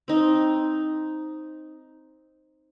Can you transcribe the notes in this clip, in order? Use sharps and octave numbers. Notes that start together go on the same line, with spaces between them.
C4 D#4